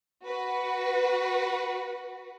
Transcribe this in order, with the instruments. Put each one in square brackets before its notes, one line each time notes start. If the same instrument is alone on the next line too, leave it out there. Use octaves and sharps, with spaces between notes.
[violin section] F#4 B4